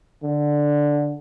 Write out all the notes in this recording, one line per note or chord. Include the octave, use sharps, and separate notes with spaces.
D3